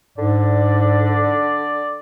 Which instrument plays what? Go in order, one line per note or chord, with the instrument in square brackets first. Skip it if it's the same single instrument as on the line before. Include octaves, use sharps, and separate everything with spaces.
[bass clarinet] G#2 [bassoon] D3 [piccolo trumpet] D5